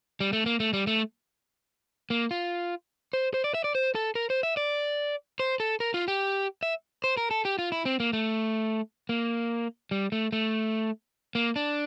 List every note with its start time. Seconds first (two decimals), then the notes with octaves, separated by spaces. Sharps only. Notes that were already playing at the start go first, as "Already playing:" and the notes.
0.20 G3
0.33 A3
0.46 A#3
0.60 A3
0.73 G3
0.87 A3
2.10 A#3
2.31 F4
3.13 C5
3.34 C5
3.44 D5
3.54 E5
3.64 D5
3.75 C5
3.95 A4
4.15 A#4
4.30 C5
4.43 E5
4.57 D5
5.40 C5
5.60 A4
5.80 A#4
5.94 F4
6.08 G4
6.63 E5
7.04 C5
7.17 A#4
7.31 A4
7.45 G4
7.59 F4
7.72 E4
7.86 C4
8.00 A#3
8.13 A3
9.09 A#3
9.91 G3
10.12 A3
10.32 A3
11.35 A#3
11.56 D4